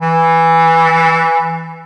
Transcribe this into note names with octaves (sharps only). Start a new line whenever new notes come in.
E3